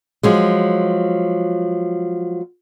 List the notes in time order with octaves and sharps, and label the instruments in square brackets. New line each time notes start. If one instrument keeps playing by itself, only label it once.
[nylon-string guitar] F3 F#3 G#3